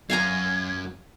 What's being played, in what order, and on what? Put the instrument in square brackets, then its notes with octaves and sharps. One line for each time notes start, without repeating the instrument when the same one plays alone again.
[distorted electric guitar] F#2 [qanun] F5 G#5 A#5 [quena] G#6